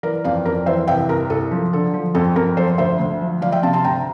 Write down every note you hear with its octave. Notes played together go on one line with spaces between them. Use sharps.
E3 A#4 D5
F2 D5 F5
F2 A#4 D5
E3 C5 E5
C2 E5 G5
C2 A#4
C2 A4
F3
D3 A4
F3
F2 A4
F2 A#4
F3 A4 C5
D2 C5 E5
D2
F3
F3 D5 F5
E5 G5
C3 F5 A5
A5 C6
D2 G5 A#5